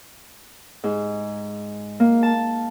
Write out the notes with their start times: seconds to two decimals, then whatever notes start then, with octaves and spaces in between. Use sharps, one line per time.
0.84 G#2
2.00 A#3
2.23 A5